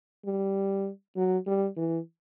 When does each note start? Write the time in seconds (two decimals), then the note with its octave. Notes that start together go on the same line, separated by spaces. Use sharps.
0.25 G3
1.17 F#3
1.47 G3
1.77 E3